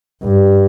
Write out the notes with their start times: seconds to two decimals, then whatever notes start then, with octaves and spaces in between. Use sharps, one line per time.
0.23 G2